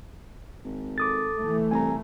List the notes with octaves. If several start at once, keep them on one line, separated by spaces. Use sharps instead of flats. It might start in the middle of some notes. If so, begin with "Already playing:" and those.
G#1
A4 D6 D#6 A6
E3 A3
C2 G#5 A#5